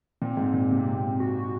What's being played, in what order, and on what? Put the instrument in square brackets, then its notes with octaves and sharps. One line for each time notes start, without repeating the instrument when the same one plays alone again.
[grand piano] A#2 [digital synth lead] C4
[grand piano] G#2
A#2
[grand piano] C3 [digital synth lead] A#3
[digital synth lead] A#3
C4
F#4